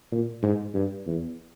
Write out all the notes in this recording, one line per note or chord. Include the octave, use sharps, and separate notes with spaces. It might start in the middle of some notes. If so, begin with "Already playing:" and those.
A#2
G#2
G2
E2